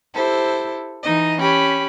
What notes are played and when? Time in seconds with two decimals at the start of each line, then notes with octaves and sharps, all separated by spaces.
0.13 E4 G4 A4 C5
1.02 E3 D#4 D#5
1.39 C#4 G4 B5